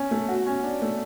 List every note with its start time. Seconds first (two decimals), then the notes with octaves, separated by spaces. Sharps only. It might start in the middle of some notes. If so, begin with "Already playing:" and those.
Already playing: C#4
0.11 A3
0.29 F#4
0.47 C#4
0.64 D4
0.82 A3